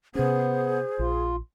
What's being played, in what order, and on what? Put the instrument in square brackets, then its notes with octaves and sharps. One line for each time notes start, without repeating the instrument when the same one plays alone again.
[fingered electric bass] C3 C#4 [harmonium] B3 [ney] G#4 [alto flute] C5
[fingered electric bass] A#1 [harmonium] F4